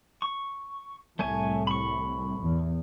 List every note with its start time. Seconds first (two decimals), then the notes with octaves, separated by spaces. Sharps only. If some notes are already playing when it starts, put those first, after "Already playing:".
0.22 C#6
1.19 C2 A2 A3 C#5 G#5
1.67 B5 C#6
2.39 E2